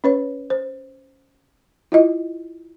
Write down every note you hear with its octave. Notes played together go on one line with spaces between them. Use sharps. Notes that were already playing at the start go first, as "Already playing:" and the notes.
C#4 B4 C#5
C5
E4 F4 D#5